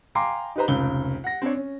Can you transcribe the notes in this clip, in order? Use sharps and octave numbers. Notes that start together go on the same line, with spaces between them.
F5 G5 G#5 A#5 C6 D6
D#4 G4 B4 C5 A#5
F1 C#2 G7
F#5 A#6
C4 D4 C#5
C#4